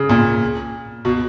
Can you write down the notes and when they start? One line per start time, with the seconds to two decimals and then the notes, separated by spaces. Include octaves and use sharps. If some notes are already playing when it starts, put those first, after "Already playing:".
Already playing: C#3
0.09 A#2
1.05 B2